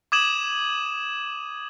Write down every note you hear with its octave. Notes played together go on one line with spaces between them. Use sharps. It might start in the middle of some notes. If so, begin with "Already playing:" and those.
D6 D#6 G#6 D#7 E7 F#7